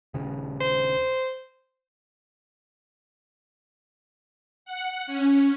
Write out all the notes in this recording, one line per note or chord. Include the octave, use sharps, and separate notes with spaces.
D#1 C#3
C5
F#5
C#4